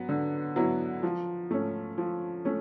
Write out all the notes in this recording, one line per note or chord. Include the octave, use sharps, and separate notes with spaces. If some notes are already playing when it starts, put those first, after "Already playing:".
Already playing: F#3 B3
D3
F#3 B3 E4
F3
A3 C#4
F3
A3 C#4